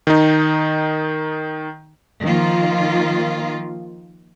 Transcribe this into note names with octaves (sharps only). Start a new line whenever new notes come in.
D#3 D#4
D#3 F3 A#3 F4